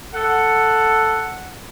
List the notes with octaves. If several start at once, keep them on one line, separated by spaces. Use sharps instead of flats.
A4 F#5